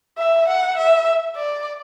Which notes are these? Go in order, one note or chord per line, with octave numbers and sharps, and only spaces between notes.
E5
F#5
E5
D5